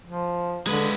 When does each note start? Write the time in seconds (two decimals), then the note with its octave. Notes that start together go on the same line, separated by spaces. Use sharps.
0.05 F3
0.67 D3 G#3 B4